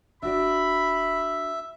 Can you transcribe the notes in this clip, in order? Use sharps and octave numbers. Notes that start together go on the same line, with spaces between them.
D#1 D4 F#4 D5 E5 B5